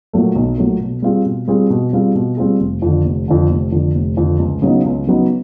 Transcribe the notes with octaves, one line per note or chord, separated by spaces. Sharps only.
A#2 F#3 A3
B1
A#2 F#3 A3
B2
G3 C4 F4 G#4
B2
G3 C4 F4 G#4
B2
G3 C4 F4 G#4
B2
G3 C4 F4 G#4
F1
F2 D3
F1
F2 D3
F1
F2 D3
F1
F2 D3
C#2
C#3 F#3 B3 D#4
C#2
C#3 F#3 B3 D#4